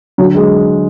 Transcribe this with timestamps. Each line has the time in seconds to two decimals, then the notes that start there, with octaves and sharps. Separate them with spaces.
0.18 D3 F#3
0.35 G#3